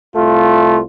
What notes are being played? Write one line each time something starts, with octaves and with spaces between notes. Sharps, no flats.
C2 A3 F4